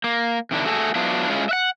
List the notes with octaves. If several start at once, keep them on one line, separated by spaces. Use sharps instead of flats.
A#3
C3 D#3 D4 E4
A3 F#4 G#4 A4
F#3 B3 D4 E4 F4
G#3 C#4 E4 F4
E5 F#5